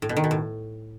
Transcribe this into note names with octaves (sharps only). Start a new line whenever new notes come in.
A2
B2
D#3
B2
A2